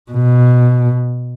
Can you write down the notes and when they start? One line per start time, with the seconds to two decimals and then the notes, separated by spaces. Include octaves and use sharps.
0.11 B2